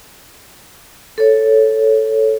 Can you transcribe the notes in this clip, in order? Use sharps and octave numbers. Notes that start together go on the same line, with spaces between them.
A4 C#5